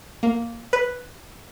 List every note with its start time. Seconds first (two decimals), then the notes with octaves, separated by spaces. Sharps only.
0.23 A#3
0.73 B4